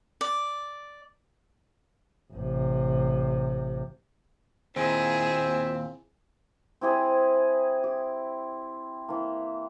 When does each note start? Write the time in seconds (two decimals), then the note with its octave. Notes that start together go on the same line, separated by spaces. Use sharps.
0.21 D5
2.34 A1 C3
4.76 D#2 A#2 C4 E4 G#4
6.81 C4 E4 G4 G#4
7.84 G4
9.08 E3 A#3